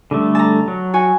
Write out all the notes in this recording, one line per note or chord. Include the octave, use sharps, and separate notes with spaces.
D3 G3 A3
A5 A#5
F#3
F#4 G#5